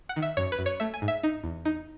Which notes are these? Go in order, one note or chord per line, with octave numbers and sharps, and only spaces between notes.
F#5
D#3
E5
F#2 C#5
B4
F#2
C#5
A3 E5
G#5
G#2
E5
D#4
E2
D#4